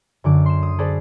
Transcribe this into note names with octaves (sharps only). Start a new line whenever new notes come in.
F#2 D3 D6
C6 E7
D#6
G#4 A4 B4 C5 D5 A5